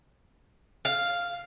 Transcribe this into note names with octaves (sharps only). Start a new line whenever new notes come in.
F5